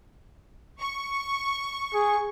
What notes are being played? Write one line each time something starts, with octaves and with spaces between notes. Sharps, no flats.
C#6
G#4